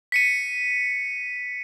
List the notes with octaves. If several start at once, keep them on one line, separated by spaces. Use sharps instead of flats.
B6 C#7 D#7